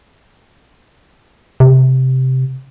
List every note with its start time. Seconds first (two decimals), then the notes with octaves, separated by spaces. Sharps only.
1.60 C3